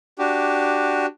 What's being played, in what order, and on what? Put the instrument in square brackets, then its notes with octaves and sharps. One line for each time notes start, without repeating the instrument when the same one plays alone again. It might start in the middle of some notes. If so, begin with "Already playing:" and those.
[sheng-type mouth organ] D4 F#4 G4